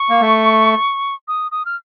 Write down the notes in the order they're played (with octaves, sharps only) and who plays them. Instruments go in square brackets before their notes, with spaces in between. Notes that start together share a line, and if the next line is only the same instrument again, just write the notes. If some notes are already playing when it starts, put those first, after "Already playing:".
Already playing: [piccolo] C#6
[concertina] A#3
A3
[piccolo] D#6
D#6
F6